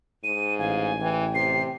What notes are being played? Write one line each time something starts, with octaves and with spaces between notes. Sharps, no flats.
G#2 D#7
A1 F5 G#5
E3 G5
C3 C7